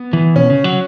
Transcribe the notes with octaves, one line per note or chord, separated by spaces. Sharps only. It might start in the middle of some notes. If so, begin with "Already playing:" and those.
Already playing: B3
E3
B2 C#4
C#3
F#3